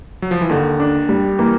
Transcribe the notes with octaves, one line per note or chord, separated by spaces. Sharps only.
F#3
F3
E3
D#2 D3 D#3
D4
G3
E3 A#3